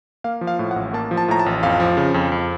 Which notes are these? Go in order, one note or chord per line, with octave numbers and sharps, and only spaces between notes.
A#3 F5
F3
F5
A2
F#5
A1
A#3 A5
F3
A5
A2 A#5
A5
A1
F2 F5
F3
C#3
F2
F2